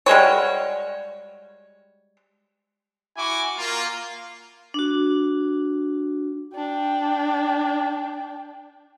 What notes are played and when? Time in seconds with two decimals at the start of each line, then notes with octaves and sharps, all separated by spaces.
0.06 G3 G#3 F#4 C#5
3.16 E4 F#4 G#5 D6
3.58 A#3 F4
4.74 D4 F#4
6.55 D4 G5